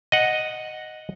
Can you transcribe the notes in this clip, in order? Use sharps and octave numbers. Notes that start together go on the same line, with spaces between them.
D#5 F#5